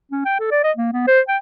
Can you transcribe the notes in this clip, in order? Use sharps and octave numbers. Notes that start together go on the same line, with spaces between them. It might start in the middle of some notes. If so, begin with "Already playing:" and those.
C#4
G5
A4
D5
D#5
A#3
B3
C5
G5